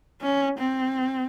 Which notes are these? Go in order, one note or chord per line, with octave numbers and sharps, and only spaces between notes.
C#4
C4